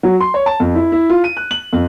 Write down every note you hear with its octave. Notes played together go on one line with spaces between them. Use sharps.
F#3
C6
C#5
A5
F2
E4
E4
F4
D#7
F#6
F#7
F2